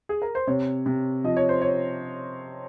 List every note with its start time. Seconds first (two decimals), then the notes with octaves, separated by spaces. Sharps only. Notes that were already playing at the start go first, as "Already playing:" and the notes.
0.09 G#4
0.22 A#4
0.35 C5
0.47 C3 C#5
0.86 C3
1.24 F3 D#5
1.37 C#5
1.49 C5
1.62 C#5